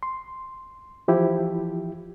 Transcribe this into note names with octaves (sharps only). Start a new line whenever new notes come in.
C6
E3 F3 E4 G4